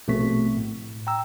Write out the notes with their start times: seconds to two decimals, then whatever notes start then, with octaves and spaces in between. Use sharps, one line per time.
0.08 A#1 B2 A3 C4 C#6 B6
0.57 A2
1.07 G5 A#5 E6